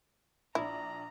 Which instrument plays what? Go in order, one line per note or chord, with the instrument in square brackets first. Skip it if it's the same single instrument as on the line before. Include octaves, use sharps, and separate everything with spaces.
[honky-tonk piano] A#1 D4 [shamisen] E4 [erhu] A#5